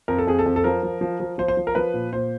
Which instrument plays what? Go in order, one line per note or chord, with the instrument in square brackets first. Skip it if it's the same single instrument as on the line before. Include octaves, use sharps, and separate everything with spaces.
[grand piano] F2 A#4
A4
F2 G#4
A4
F2
A4
F3 A#4
F3
F3
F3
F3 C5
C5
F3
A#4
F3 B4
A#2
A#2 C5